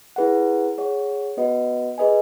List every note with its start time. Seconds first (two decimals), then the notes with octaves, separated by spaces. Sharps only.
0.16 E4 G#4 B4 F#5
0.78 G#4 C#5 F#5
1.37 B3 F#4 B4 D#5 F#5
1.98 G#4 B4 D#5 G#5